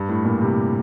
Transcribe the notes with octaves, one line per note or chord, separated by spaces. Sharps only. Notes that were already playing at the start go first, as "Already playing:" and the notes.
Already playing: G2
A2
A#2
C3